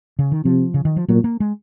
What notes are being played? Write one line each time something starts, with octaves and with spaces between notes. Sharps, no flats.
C#3
D#3
C3 F3
C#3
D#3
F3
A#2 F#3
A#3
G#3